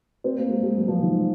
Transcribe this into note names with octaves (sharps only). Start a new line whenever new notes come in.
C4
A#3
G#3
G#3
F#3
F3
D#3